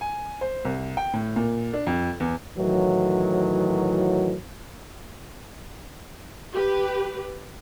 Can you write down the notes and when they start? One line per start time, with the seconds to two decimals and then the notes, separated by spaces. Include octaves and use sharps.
0.01 G#5
0.41 C5
0.65 C2
0.97 G5
1.14 A2
1.36 A#2
1.74 D4
1.87 F2
2.20 E2
2.58 A2 D#3 E3 F#3
6.53 G4 B4